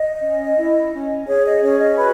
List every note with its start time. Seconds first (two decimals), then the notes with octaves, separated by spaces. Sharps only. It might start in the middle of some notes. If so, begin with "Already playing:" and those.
Already playing: D#5
0.22 C#4
0.57 E4
0.92 C#4
1.27 G#4 C#5
1.45 D#5
1.62 C#4 C#5
1.80 D#5
1.98 F#4 B4 B5